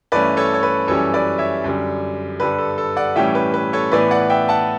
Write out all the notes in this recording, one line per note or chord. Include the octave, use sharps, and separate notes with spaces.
G2 E3 A3 C#4 B4 D5
A4 C#5
C#5
B4
F#2 E3 G3 C#4 A4 C#5
B4 D5
C#5 E5
F#2 D3 G3
G2 D3 G3 B4
A4
A4
D5 F#5
A2 E3 G3 C#4 E5 G5
B4
B4
A4 C#5
A2 E3 B3 B4 D5
D5 F#5
E5 G5
F#5 A5